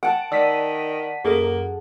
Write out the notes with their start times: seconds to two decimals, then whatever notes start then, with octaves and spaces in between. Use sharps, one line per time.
0.03 F#5 G5 A5 D7
0.32 D#3 D5 E6 B6 D#7
1.25 F#2 A#3 G#4 A4